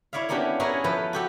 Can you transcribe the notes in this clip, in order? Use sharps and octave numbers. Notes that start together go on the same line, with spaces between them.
E4 C#5 D5 E5 F5
A#3 B3 C#4 D4 G4
C#4 E4 G#4 A#4 B4 C#5
F3 A4 B4
F#4 G4 A4